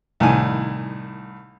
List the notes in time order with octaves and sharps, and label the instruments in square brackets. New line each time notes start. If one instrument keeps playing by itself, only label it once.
[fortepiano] C2 A2 D#3 G#5